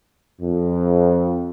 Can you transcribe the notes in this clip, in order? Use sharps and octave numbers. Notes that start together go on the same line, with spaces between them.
F2